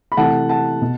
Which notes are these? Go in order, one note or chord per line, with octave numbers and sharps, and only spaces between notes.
B5
C3 E3 A3 F#5 A5
F#5 A5
B2